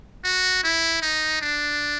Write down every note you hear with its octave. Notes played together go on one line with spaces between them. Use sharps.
F#4
E4
D#4
D4